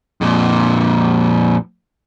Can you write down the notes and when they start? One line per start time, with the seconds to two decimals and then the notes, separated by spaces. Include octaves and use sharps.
0.21 F2 A#2